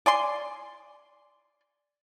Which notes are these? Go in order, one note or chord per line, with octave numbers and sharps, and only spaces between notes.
D5 G#5 C6